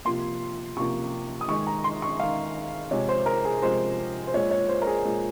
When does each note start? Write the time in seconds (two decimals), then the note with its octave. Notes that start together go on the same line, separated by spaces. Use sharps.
0.05 C3 F3 A#3 C6
0.77 C3 F3 A#3 C#6
1.41 D#6
1.48 D#3 G#3 C#6
1.67 A#5
1.84 C6
2.02 C#6
2.19 D#3 G#3 F5
2.91 C3 F3 G#3 C#5
3.09 C5
3.26 A#4
3.45 G#4
3.62 C3 F3 G#3 C5
4.27 C5
4.34 A#2 G#3 C#5
4.51 C#5
4.69 C5
4.82 A#4
4.87 G#4
5.05 A#2 G#3